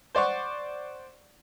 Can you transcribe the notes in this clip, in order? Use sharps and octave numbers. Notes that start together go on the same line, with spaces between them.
C5 D5 F#5 C#6